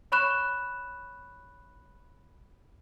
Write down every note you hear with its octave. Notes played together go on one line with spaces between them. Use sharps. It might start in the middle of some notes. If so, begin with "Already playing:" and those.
C#5 B5 C#6 F#6 E7